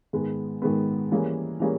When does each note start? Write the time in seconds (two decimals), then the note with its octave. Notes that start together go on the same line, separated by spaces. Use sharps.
0.13 G#2 D#3 G#3 B3
0.62 G#2 D#3 G#3 B3
1.11 E3 G3 A#3 C#4 G#4
1.60 E3 G3 A#3 C#4 G#4